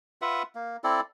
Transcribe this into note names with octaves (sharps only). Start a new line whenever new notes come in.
F4 B4 E5 F#5
A#3
C4 E4 A4 D5